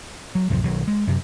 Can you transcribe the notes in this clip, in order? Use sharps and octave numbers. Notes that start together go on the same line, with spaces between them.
F#3
C2 F#2 A2 F3
B1 D#3 F#3
G#3
F#2 C3